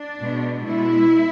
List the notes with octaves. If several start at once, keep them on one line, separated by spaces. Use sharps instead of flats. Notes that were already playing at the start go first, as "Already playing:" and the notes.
Already playing: D4
B2 G#3
B2 G#3 E4